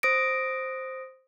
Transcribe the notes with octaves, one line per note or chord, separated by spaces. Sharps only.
C5 D#6 A#6 D7